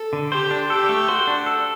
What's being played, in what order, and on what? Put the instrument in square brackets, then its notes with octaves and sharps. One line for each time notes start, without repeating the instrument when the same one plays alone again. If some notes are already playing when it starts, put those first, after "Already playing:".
Already playing: [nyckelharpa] A4
[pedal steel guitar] D3
[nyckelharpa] G4 [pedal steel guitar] C5
[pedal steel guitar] D4
[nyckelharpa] G4 [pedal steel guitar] A4
[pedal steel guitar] A3
[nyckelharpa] F#4 [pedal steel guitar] C5
[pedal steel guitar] D4
A4